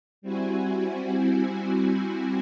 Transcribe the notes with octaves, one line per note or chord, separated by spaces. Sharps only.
G3 C4 E4 F#4 G#5